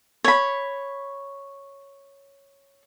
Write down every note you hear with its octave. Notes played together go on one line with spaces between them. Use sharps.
C#5 B5